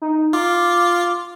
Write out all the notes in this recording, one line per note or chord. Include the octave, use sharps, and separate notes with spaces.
D#4
F4 D6